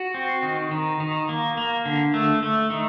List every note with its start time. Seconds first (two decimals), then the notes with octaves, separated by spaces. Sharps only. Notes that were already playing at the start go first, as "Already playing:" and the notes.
Already playing: F#4
0.14 C4
0.43 D#3
0.71 D#3
1.00 D#3
1.29 A#3
1.57 A#3
1.86 D3
2.14 A3
2.43 A3
2.70 D#3